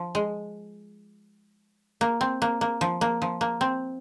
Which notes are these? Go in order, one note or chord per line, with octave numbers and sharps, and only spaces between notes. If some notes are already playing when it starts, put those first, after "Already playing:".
Already playing: F3
G#3
A#3
C4
A#3
A#3
F3
A#3
F3
A#3
C4